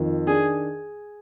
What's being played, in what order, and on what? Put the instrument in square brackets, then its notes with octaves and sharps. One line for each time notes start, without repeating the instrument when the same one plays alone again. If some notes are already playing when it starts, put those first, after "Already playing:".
Already playing: [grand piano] F2 D#3
[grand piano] D4 [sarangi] G#4